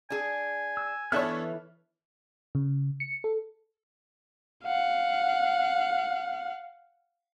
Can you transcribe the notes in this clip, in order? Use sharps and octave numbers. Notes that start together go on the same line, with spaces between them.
D4 G#4 G#5
E6
E3 B3 D4 A4 C#5 E5 A5 F6
C#3
C#7
A4
F5 F#5